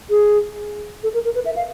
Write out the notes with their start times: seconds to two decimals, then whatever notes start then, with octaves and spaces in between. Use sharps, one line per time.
0.10 G#4
1.03 A4
1.14 A#4
1.25 A#4
1.35 B4
1.45 E5
1.56 F5